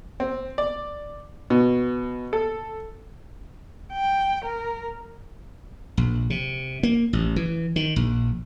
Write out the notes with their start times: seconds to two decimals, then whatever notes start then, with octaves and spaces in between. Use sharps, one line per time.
0.20 C4
0.58 D5
1.50 B2
2.33 A4
3.93 G5
4.45 A#4
5.97 A#1
6.30 C3
6.83 A#3
7.13 A1
7.36 E3
7.76 D#3
7.96 A#1